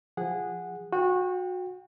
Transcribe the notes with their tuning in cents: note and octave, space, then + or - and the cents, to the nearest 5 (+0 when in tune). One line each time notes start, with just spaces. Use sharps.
F3 +0 G#4 -15 F#5 -10
F#4 -25 G5 +15